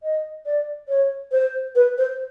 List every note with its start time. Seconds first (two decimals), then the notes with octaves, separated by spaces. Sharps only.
0.03 D#5
0.46 D5
0.89 C#5
1.32 C5
1.75 B4
1.98 C5